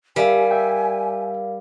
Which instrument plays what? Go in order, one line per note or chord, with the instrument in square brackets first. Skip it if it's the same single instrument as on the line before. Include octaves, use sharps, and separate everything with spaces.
[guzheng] G3 [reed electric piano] G4 E5 [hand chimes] A#4 D5 F5 [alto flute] G#5
[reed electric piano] E5 G5